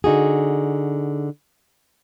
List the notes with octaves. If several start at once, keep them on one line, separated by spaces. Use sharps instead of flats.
D3 D#4 F#4 G#4